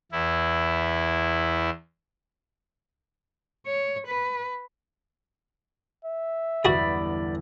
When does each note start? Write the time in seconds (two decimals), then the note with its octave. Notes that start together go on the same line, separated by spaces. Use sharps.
0.12 E2 E4
3.66 C#5
4.08 B4
6.05 E5
6.65 G1 E2 F#4 G#4 D5 B5